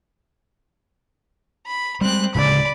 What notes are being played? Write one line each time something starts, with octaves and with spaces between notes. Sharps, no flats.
B5
G3 G#3 C4 F#6
D1 C#3 G#3 D5 B5